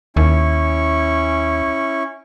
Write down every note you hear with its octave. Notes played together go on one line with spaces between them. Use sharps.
D#2 C#4 E4 C#6